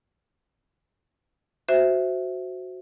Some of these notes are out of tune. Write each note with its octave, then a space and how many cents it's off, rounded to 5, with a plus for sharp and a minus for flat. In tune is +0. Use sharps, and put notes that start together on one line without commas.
F#4 +0 C5 -5 E5 +0